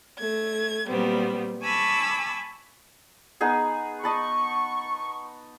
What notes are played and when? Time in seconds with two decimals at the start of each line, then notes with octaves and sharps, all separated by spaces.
0.19 A3 G#6
0.87 A#2 F#3 G3 B3 C4
1.63 G#5 A5 B5 C#6 D6 E6
3.41 B3 D#4 G#4
4.04 D#5 A5 B5 C#6